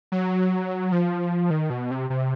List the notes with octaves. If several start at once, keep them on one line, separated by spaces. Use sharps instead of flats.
F#3
F3
D#3
B2
C3
C3